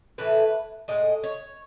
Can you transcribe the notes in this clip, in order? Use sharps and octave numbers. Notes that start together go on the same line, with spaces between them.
A2 E3 A3 B4
A2 G#3 D#5
C#5